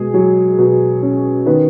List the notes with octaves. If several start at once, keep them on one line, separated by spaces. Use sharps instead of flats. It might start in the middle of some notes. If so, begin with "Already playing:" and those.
Already playing: B2 G#3 G#4
F#3
B2
C#4
D#3 B3 B4